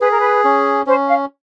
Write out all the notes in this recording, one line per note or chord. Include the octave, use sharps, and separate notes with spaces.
G#4 B4
A#4
B4
C#4
C#4 C5
F5